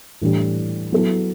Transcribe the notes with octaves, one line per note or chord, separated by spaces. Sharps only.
A2 E3 G3 D4 G4
F#3 B3 E4 A4